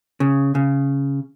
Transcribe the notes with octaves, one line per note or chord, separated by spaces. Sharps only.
C#3
C#3